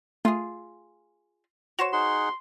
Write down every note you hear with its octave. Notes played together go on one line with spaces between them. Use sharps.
A3 F4 G#4
F#4 C5 C#5 E7
D#4 G#4 F#5 C6